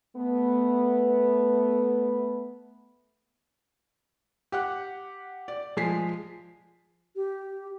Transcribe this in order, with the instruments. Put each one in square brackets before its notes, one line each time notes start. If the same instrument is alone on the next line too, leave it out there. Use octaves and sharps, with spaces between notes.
[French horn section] A3 B3
[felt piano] G4 F#5 F#6
D5
F3 G#3 G#5 B6 C7
[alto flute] G4